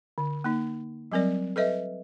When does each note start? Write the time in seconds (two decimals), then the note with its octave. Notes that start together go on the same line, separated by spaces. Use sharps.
0.18 D3
0.44 A#3 D#4
1.12 F#3 G3 C4 A#4 D5
1.56 A4 B4 D#5 E5